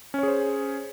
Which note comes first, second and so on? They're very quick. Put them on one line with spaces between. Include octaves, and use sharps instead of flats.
C#4 C#5 G#4 C5